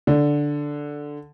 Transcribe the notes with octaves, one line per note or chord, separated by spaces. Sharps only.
D3